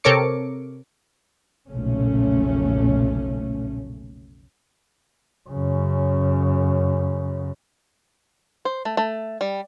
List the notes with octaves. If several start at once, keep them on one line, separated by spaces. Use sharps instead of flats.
C3 A4 A#4 C#5 D6 C#7
F1 B1 A#2 C#3 A3 C#4
F#2 C#3
C5
A3
A3
G3